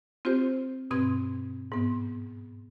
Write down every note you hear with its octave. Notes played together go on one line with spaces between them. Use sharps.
C4 F4 G4 C5
G2 B2 C4 C6 G#6
G#2 B3